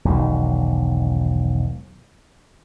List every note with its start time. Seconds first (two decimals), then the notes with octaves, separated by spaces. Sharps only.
0.05 E1 B1 D#3